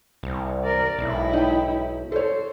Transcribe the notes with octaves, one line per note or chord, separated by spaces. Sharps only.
C2
A#4 D5
B1 G#2 E4
D#4 G5
A4 C5 C#5